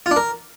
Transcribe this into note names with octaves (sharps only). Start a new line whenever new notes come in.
F4
D4
A#4